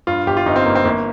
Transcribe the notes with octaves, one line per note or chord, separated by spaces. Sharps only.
G2 F4
G1 G4
F4
G1 D#4
C4
G1 A#3
C4
G1 A#3